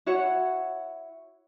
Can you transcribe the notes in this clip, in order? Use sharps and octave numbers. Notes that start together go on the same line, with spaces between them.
E4 F#4 C#5 F#5